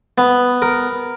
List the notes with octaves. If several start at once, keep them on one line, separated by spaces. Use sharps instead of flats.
B3
A#4